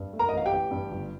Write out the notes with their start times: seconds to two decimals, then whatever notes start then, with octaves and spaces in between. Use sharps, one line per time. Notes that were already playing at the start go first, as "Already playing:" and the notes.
Already playing: G2
0.13 A3
0.19 A#4 A#5
0.29 D#5
0.33 A1 F5
0.46 G4 G5
0.52 A1
0.71 G2
0.91 G1